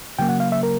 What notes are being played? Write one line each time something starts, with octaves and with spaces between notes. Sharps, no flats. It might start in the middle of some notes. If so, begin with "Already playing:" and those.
C#3 F#3 A#3 G5
F#5
F5
E5
A#4